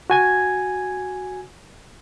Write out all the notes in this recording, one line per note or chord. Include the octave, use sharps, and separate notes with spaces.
F#4 G#5 G#6